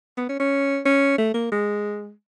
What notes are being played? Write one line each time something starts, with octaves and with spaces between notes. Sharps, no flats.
B3
C#4
C#4
C#4
A3
A#3
G#3